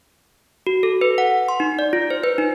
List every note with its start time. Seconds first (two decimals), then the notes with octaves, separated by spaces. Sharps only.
0.67 F#4
0.83 A4
1.01 B4
1.18 F#5
1.48 C6
1.60 D#4
1.79 D5
1.93 F4
2.10 C5
2.24 B4
2.38 D#4